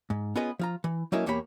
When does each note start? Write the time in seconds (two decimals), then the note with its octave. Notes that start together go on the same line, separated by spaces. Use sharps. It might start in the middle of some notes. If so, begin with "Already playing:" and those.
0.10 G#2
0.35 B3 C#4 F4 G#4 B4 D#5
0.59 F3 F4 A#5
0.84 E3
1.12 F#3 A3 A#3 C#4 E4 D#5
1.26 E2 A#3 G4 C#5 G5 B5